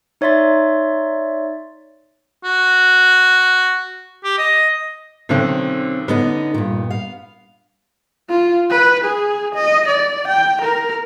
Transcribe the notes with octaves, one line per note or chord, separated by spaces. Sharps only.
D#4 C#5 D5 E5 C6 A6
F#4
G4
D#5
B1 D3 D#3 C4 C#4
D3 B3 C#4 D#4
G2 A#2
F5
F4
B4
G#4
D#5
D5
G5
A#4